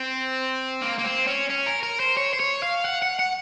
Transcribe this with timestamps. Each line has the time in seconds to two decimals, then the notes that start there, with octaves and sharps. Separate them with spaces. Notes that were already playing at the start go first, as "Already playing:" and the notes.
Already playing: C4
0.82 A#3
0.99 A#3
1.04 C4
1.27 C#4
1.50 C#4
1.67 A#4
1.83 A#4
2.00 C5
2.17 C#5
2.33 C5
2.40 C#5
2.63 F5
2.85 F#5
3.02 F#5
3.19 F#5